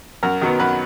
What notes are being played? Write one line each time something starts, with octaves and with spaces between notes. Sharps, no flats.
F#2 A#4
D#3 F#3 B3
F#2 B4